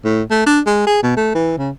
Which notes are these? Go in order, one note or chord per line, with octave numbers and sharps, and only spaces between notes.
A2
A3
D4
G#3
G#4
B2
A3
E3
C#3